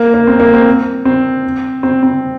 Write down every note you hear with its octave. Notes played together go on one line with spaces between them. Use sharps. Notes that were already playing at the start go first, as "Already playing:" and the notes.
Already playing: A#3
A#3
C4
A#3
C4
C4
C4
C4